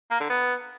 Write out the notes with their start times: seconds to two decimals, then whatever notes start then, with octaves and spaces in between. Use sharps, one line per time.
0.11 A#3
0.20 D3
0.30 B3